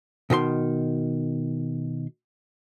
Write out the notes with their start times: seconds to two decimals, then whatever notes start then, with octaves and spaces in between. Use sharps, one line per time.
0.30 B2 D#3 D#5 C6